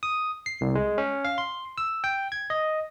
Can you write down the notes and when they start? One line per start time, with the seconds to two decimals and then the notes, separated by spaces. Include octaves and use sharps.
0.03 D#6
0.46 C7
0.61 C2
0.75 G#3
0.98 C#4
1.25 F5
1.38 C6
1.78 E6
2.04 G5
2.32 G#6
2.50 D#5